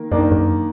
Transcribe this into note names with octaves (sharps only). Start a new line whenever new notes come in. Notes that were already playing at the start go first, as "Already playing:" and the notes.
Already playing: D#3 A#3
F#2 D#3 A#3 D4
F#2